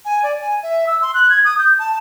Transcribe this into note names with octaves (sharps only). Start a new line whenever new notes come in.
G#5
D5
G#5
E5
E6
C6
F#6
G#6
D#6
G6
A5